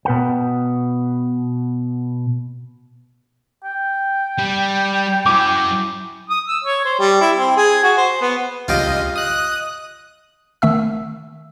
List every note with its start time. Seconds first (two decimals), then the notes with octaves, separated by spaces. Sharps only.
0.05 B2 B4 F#5 G5
3.65 G5
4.38 G3
5.26 F#3 C#4 E4 D6
6.30 D#6
6.48 E6
6.64 C#5
6.85 C5
6.99 G3
7.21 E4
7.36 C4
7.57 G#4
7.84 F#4
7.98 C5
8.21 B3
8.68 C#2 F4 G4 D#5 F5
9.16 D#5 D#6 F#6
10.62 D#3 A3 E5 E6